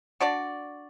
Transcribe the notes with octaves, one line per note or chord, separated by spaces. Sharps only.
D4 F#4 D5